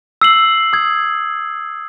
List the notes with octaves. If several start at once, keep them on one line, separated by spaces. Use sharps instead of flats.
E6 C7 F#7
D#6 G#6